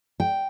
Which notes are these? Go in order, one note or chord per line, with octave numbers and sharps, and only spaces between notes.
G5